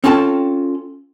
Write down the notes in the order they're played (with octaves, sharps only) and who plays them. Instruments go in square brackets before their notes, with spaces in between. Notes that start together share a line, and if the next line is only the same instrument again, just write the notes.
[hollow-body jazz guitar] C4 C#4 F4 A4 G5 A5